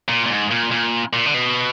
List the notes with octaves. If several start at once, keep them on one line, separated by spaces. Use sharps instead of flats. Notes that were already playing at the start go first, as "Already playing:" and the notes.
A#2
A#2
G#2
A#2
A#2
A#2
D3
B2